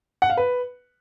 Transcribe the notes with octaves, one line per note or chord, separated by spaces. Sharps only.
F#5
F5
B4